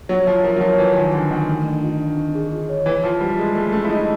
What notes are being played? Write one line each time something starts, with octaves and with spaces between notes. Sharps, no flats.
F#3 C#5
F3 E5
F3 A#4
F#3
F3 C#5
E3 G#5
E3
D#3 G#5
D3 G#5
D#3 G#5
A3
D4
F4
D4
C4
G#4
F4
C#5
E3 E5
F3 E5
G3 C5
G#3 G#4
A3 G#4
A3 C#4
E4
D#4 G#4